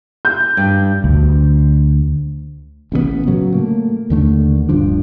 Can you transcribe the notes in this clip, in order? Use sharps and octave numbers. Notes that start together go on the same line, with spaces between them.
G6
G2
D2
A1 C#3 F#3 B3
A2 C#3 F#3
A3 A#3
D#2 D3 A3
D1 G2 F3 D4